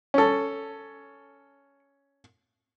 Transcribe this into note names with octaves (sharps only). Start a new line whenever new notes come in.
C#4 A4